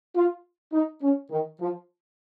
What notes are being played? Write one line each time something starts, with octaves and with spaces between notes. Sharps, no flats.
F4
D#4
C#4
D#3
F3